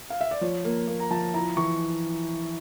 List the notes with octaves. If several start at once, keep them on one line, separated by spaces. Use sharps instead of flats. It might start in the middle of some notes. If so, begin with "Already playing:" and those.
F5
E5
D5
F3 C#5
A#3
A#3
A#5
F3 A5
E4 A#5
E3 C#6